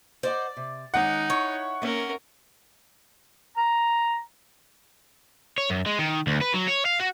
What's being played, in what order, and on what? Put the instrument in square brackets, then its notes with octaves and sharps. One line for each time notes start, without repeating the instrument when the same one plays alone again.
[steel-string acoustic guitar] C5 D#5 F#5 [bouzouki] D5
[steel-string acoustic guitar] C3
[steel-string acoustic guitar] D#3 G#3 C#4 [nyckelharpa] D#4 [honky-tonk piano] F#5
[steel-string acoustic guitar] E4 [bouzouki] C#5
[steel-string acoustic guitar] A#3 E5 [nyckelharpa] C#4 A#4
[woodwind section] A#5
[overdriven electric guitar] C#5
F#2
G#3
D#3
D2
B4
F#3
C#5
F5
F#4